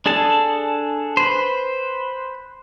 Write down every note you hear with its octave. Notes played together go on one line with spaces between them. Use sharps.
D4 G#4 A4 A5
B4 C5